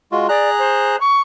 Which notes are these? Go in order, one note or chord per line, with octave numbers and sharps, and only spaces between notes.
G#3 F4 F#4
G#4 D5 A#5 F#6
C5
C#6